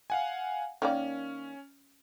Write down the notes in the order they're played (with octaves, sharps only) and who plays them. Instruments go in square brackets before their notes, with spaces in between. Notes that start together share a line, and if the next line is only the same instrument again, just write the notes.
[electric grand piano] F5 F#5 G#5
[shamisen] D#3 A#3 D5 [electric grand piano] C#4